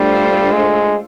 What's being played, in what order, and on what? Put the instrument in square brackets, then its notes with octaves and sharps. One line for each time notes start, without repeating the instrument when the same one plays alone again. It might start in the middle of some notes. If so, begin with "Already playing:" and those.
Already playing: [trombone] G3 [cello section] A3 D4 F4 A4 C5
[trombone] G#3